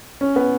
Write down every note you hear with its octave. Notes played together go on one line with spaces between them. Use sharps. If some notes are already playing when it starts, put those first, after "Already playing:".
C#4
B3